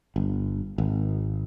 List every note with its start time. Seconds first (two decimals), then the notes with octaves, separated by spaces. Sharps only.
0.16 G1
0.78 G#1